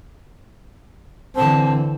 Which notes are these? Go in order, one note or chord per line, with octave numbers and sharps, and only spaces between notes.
D3 E3 C4 A5